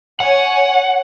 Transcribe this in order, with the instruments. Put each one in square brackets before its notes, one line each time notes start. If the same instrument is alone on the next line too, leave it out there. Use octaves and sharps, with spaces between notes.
[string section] C#5 G#5 [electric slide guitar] F#5